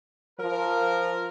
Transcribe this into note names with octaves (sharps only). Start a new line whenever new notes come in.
F3 A#4